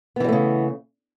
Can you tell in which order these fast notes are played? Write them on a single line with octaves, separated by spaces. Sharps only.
B3 E3 G3 A3 C#3